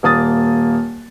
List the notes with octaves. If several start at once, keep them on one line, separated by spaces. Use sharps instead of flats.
D#1 A#3 D#6 A6